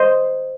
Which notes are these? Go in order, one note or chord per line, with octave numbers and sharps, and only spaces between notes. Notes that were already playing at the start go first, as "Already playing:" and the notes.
Already playing: C5 D#5